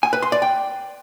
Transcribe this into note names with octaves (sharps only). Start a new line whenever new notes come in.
G#5
B4
C6
D5
G5